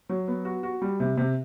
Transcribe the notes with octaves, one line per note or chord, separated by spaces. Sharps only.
F#3
B3
F#4
F#4
G3
C3
C3